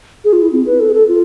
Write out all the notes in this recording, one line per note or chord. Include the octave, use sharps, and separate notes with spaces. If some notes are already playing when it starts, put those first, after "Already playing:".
G#4
F4
E4
C4
B4
A4
G#4
A4
F4